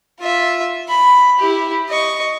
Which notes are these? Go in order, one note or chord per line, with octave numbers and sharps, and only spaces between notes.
F4 E5
B5
E4 G4
D#5 C#6